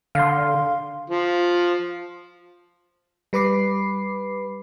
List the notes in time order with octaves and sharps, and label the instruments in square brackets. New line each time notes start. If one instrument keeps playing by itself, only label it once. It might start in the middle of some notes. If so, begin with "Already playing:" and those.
[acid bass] D3 [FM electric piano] F5 C6
[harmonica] F3
[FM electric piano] G3 B4 B5 D6 C7